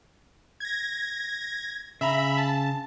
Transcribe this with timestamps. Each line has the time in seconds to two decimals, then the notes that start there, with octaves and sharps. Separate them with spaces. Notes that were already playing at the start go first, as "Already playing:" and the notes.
0.60 G#6 A#6
2.01 C#3 E5 A#5 B5
2.38 A5